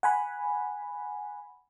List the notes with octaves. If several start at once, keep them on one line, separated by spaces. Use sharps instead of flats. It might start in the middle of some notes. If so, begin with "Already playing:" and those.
F#5 G#5 B5